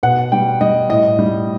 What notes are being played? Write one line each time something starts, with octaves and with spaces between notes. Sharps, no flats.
B2 F#5
G3 G5
G3 D#5
A2 D#5
G3